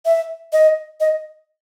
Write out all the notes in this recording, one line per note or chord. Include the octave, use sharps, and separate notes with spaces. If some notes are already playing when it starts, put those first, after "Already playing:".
E5
D#5
D#5